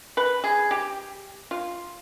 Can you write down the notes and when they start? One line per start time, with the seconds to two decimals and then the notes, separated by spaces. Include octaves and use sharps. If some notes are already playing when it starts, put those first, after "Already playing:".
0.17 B4
0.44 G#4
0.71 G4
1.51 F4